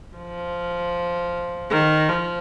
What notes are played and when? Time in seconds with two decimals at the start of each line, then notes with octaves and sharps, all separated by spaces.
0.17 F3
1.71 D#3
2.09 F3